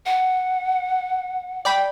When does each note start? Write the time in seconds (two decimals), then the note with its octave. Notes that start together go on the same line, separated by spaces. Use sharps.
0.06 F#5
1.65 D5 G5 B5